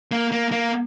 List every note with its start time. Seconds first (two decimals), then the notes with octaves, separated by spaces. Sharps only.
0.11 A#3
0.32 A#3
0.52 A#3